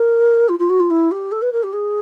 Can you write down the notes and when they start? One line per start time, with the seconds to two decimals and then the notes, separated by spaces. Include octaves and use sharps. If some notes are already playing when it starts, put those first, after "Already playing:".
Already playing: A#4
0.48 F4
0.59 F4
0.69 F#4
0.80 F4
0.90 E4
1.11 G4
1.31 A4
1.42 B4
1.52 A#4
1.63 G4
1.73 G#4